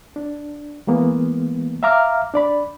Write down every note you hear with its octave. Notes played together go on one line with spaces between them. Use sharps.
D4
E3 G#3 A#3 B3
E5 F5 A#5 D6 F6
D4 D5 B5